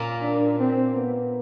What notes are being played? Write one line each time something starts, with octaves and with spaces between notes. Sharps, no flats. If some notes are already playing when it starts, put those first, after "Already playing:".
Already playing: A#2 A#3 C#4
D4
C4
B3